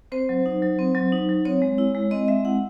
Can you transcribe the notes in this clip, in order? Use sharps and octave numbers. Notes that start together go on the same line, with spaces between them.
C4 C5
F#3
D#4
F#3
C4
F#3
D#4
F#3
C4 C#5
G#3
E4
G#3
C4 D#5
G#3 E5
E4 F#5